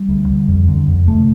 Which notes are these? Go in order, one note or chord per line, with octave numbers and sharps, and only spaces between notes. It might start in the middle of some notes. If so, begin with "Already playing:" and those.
Already playing: G3
D2
D3
F2
D3
F2
C3 A3